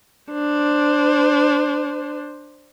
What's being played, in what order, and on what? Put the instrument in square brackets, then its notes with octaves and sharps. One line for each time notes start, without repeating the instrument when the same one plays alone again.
[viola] D4 C5